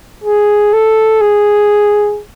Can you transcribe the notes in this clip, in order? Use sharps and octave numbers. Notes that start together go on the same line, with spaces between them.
G#4
A4
G#4